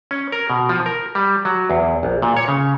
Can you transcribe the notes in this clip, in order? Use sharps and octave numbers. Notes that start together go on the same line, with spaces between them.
C#4
A#4
B2
F3
A#4
G3
F#3
E2
A#1
A#2
C#5
C#3